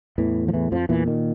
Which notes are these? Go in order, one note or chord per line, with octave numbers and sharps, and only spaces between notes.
E2 A2 E3
F3
E2 E3
F2 F3
E2 A#2 E3
D#3